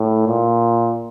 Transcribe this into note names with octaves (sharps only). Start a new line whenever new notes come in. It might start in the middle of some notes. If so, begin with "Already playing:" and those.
Already playing: A2
A#2